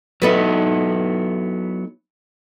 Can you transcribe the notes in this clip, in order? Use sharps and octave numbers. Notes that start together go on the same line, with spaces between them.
F#3 B3 D#4 E4 A4 B4